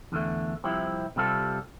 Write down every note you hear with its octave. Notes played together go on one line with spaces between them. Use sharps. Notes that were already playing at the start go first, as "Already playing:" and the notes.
E2 D3 A3
C2 C3 F3 C4 E4
C3 G3 C4 F4 A4